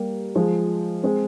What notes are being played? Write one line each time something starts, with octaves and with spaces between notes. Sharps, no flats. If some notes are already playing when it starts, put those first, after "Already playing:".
Already playing: G3 A#3
F3 G#3
G#3 C4